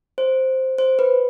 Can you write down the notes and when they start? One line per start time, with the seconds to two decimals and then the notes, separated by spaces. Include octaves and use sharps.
0.18 C5
0.78 C5
0.99 B4